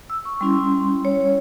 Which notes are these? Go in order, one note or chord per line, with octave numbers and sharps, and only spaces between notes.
E6
C#6
G3 C#4 E4 C6
C#5